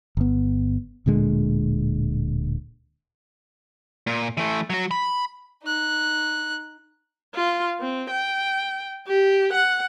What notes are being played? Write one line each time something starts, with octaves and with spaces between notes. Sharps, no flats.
G1 B3
D1 A#2 D3 G#3
A#2
E3 A3
F#3 F#4
B5
D#4 F#6
F4
C4
G5
G4
F#5